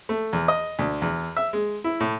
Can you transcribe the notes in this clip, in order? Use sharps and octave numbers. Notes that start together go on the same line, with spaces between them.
A3
E2
D#5
D2
E2
E5
G#3
E4
A2